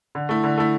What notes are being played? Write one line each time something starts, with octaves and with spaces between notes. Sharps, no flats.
D3
A3 E4
D3
A3 E4